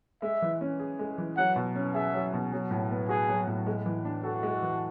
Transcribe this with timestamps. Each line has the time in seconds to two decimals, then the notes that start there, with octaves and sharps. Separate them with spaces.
0.22 G#3 E5
0.42 E3
0.61 C#4
0.80 G#4
0.99 G#3
1.18 E3
1.37 F#3 F#5
1.56 B2
1.75 C#4
1.94 G#4 E5
2.14 F#3
2.33 B2
2.52 F#3
2.71 A2
2.91 B3
3.09 F#4 G#4
3.29 F#3
3.47 A2
3.67 G#3
3.86 E3
4.05 D4
4.24 F#4 A4
4.43 G#3
4.63 E3